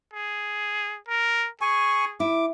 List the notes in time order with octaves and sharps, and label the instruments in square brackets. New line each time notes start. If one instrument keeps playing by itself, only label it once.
[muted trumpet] G#4
A#4
[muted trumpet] G#4 [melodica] G#5 C#6
[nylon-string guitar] E4 [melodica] D6